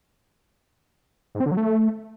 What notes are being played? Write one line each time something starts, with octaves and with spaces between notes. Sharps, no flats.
G#2
C4
D3
F#3
A3